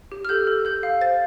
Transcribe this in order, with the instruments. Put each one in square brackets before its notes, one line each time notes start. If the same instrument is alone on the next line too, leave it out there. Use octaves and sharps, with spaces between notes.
[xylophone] G4
F6
A4 G6
A4
A4 G6
F5
C5 A6